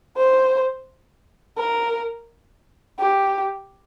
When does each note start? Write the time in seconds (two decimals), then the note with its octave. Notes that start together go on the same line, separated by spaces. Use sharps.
0.17 C5
1.57 A#4
2.99 G4